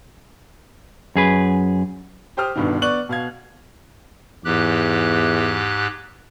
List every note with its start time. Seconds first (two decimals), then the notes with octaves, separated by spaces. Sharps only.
1.16 F#2 G#4 B4
2.37 G4 C5 G5 D#6 F6
2.56 G1 G2 B2 D#3
2.82 B3 D5 C#6 F#6 F#7
3.09 B2 F5 G#6
4.45 E2 G#2 G4 F#6